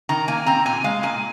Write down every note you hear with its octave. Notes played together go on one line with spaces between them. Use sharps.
D#3 A#5
A#3 G#5
C4 A#5
A#2 G#5
G#3 F5
A#2 G#5